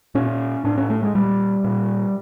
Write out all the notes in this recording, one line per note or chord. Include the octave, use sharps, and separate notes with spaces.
A#2 C#4
A2 D4
C#4
A3
G#3
A#2 G3
A#2